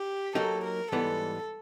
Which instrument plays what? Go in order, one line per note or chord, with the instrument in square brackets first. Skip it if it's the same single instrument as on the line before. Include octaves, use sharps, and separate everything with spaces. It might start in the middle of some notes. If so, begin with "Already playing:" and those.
Already playing: [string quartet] G4
[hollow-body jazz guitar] F#3 A#3 D#4 G4 [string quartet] A4
[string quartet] A#4
[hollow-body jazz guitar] G#2 E3 G3 B3 [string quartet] A4